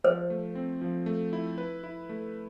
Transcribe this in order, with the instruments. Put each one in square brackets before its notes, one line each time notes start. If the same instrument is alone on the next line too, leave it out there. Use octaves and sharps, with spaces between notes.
[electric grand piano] F3 [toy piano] C5
[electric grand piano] A3
C4
F3
A3
E4
B4
E4
A3